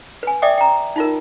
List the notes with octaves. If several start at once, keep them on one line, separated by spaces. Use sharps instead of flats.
B4 G#5
D5 E5 G5 D6 D#6
G5 A#5
D#4 F4 A#4